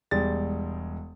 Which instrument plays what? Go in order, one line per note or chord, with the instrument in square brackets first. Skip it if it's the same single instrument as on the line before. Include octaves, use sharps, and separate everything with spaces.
[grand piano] E1 G3 G#3 A6